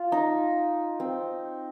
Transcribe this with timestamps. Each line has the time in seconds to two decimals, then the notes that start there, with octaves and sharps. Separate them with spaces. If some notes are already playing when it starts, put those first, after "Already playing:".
Already playing: F4
0.12 D#4
1.00 C4